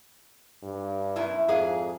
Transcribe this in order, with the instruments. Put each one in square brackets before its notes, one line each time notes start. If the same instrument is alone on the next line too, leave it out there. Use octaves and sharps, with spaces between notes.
[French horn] G2
[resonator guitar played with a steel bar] F#2 B2 E4
[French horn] F2 [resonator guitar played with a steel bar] G#2 G#4 F5